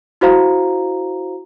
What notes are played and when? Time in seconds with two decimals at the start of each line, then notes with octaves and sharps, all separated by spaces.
0.21 E4 F#4 C5 F5 A#5